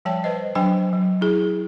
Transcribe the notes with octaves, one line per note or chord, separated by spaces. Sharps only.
F3 G3 C#5 G5 A5
B4 C5 D#5
F#3 D4 C5 G5 G#5
F#3
E4 G#4